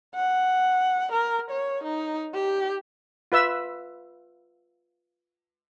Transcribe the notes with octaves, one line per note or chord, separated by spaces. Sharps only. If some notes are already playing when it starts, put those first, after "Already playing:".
F#5
A#4
C#5
D#4
G4
F4 B4 E5 E6